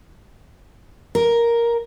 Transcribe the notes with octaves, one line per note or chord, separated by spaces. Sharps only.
A#4